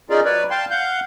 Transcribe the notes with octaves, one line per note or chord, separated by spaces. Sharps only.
C#4 D#4 F4 G#4 A#4 D5
F#3 B4 C#5 D5
F5 G5 A5 C6
F5 F#5 G6